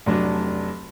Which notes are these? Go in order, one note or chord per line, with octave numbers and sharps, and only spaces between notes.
F1 F#3 D4